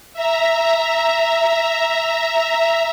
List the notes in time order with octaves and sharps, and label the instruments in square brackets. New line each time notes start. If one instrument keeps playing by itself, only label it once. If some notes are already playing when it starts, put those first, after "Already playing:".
[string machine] E5 A#5